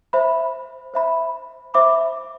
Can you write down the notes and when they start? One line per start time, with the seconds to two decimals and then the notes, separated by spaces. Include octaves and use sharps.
0.13 C5 E5 B5
0.94 C5 E5 B5
1.74 C5 E5 B5 D6